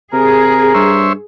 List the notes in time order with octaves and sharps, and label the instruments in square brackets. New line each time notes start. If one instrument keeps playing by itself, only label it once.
[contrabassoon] C3 [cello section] G#4 [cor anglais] A#4
[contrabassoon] G2 [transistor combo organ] C5 C#5 E5